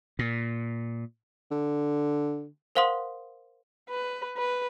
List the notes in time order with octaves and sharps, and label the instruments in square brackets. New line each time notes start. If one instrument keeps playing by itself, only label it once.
[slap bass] A#2
[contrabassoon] D3
[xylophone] A#4 C5 F5 F#5 C6 D#6
[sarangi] B4
B4